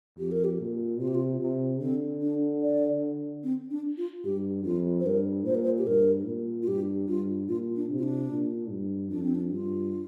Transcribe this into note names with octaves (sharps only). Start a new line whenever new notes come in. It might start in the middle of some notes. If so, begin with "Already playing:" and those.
F2 G4
A#4
G4
A#2
C3 F4
G4
F4
C3 F4
D3 C4
D4
D5
C4
D4
F4
G2 G4
F2 F4
C5
G2 A#4
A#2 C5
A#4
C5
G4
G2 A#4
A#2
F4
G2 G4
G2 F4
A#2 F4
D4
C3
F4
D4
A#2
G2
F2 D4
C4
D4
G2 F4